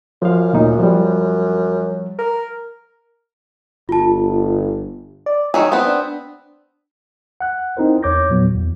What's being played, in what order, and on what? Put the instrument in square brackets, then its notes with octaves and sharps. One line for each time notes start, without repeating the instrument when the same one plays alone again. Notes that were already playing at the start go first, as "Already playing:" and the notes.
[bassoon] F#2 [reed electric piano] F3 F5
[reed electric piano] D2 A#2 D#4
F3 G3
[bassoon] A#4
[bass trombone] G1 [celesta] F4 A5
[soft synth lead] D5
[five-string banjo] D#3 F#3 G#4 [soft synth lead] E5
[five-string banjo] B3 C4
[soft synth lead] D4
[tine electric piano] F#5 F#6
C4 D#4 E4 A#4 C5
E2 C#5 D6 G6 A#6
A#2 F#3 B3
E2